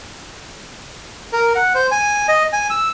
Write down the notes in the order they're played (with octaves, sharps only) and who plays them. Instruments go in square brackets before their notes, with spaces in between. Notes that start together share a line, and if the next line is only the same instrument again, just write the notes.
[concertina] A#4
F#5
C5
G#5
D#5
G#5
E6